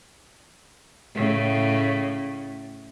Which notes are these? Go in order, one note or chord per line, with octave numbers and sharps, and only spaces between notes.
A2 C#3